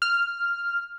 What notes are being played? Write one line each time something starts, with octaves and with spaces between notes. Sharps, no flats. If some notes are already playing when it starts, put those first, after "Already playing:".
F6